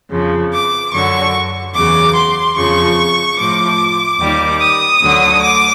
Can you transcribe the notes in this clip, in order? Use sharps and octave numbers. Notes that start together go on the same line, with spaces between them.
F2 C#3 F3
D6
F#2 D3 F#3 C#6
E2 C#3 F#3 D6
C6
F2 C#3 F3 C#6
A2 F3 D6
D#2 D#3 G3
D#6
D2 D3 F#3
D6